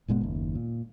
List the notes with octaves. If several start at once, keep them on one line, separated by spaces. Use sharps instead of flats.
F#1 A#2 G#3 B3
F#1 D#2
A#2